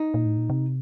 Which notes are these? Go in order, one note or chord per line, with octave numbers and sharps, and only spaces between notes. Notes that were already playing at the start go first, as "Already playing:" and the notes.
Already playing: D#4
A#2
A2
A#2
C3